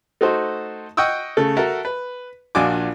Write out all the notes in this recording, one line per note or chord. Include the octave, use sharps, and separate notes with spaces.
A3 D#4 F#4 A4 C5
D#5 F#5 G5 C#6 D#6 E6
C#3 A3 A4
F#4 A4 A#4 E5 A5
B4
A#1 D4 F4 F#4 G#5 D6